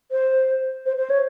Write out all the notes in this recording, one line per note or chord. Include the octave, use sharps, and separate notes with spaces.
C5
C5
C5
C#5